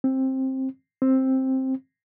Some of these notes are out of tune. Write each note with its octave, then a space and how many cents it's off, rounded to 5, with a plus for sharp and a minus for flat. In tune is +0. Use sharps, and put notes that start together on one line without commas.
C4 +15
C4 +10